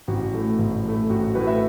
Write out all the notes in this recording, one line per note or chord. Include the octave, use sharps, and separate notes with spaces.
A1 F#4
A2 A3
A1
A2 A3
A1 F#4
F#4
A2 A3 F#4 B4
B4 E5